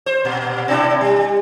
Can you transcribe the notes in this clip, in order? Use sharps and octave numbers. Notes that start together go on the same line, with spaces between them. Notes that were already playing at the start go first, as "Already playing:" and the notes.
C5
A#2
B2 D4 E4
G3